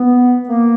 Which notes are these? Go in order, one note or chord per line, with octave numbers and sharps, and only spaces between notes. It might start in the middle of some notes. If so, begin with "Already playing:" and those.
Already playing: B3
A#3